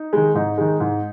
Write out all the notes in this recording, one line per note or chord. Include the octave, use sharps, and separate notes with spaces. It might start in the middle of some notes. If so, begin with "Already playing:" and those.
Already playing: D#4
D#3 G#3
G#2 D#4
D#3 G#3
G#2